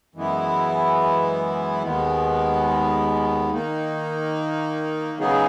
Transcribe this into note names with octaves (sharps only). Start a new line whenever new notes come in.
F#2 E3 G#3 B3 E4
D#2 D#3 G#3 B3
D#3 A#3 D#4
C#3 F#3 B3 D#4 G#4